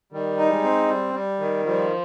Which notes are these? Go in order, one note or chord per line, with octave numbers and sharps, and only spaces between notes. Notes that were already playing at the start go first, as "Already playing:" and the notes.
D#3 G3
D#4
G#3
C4
G3
G3
D#3
F3 G3